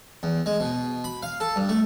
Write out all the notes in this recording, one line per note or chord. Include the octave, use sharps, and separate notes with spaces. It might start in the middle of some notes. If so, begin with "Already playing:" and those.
E2
G#3
B2
B5
F5
A4
G2
A3